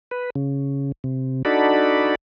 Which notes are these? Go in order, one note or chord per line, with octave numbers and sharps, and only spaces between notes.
B4
C#3
C3
D4 D#4 F#4 A4 D5 B5